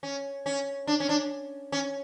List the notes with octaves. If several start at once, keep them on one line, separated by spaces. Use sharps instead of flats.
C#4
C#4
D4
C#4
D4
C#4